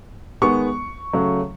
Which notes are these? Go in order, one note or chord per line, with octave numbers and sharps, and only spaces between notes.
D#3 G#3 B3 C#6
C#3 F#3 A3